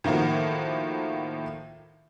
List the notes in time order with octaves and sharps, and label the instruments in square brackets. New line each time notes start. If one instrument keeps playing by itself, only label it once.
[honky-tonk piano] A2 D#3 F3 A#3 F#4